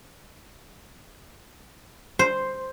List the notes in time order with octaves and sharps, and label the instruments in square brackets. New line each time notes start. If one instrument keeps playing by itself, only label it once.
[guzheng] C5